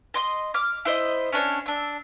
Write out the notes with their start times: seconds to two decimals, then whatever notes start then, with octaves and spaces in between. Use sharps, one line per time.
0.14 D#5 C6 D#6
0.54 D6 F6
0.85 E4 C5 D#5
1.32 C#4 D4 B4 C#5
1.66 D4 E6